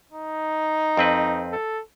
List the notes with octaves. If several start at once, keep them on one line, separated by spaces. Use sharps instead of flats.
D#4
F2 C4 B4
A4